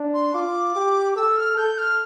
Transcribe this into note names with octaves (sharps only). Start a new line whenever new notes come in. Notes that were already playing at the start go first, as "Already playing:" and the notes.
Already playing: D4
C6
F4 D6
G4
A4 E6
F6
A4 G6
F6